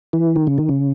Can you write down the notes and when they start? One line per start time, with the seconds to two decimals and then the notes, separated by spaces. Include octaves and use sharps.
0.13 E3
0.36 D#3
0.47 C#3
0.58 D#3
0.69 C#3